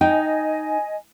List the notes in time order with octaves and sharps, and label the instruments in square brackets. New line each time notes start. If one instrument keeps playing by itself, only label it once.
[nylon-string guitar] D#4 [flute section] D#5 G#5 [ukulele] G5